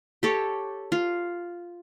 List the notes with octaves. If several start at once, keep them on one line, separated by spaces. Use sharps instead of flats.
G4 A4 C#5
F4